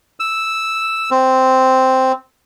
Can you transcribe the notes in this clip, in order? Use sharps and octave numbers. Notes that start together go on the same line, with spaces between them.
E6
C4